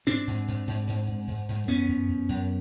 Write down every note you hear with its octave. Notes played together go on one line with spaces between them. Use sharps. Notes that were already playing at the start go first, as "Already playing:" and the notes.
G#2 C4 D4
G#2
G#2
G#2
G#2
G#2
G#2
G#2
F#2 B3 C#4
F#2
F#2
F#2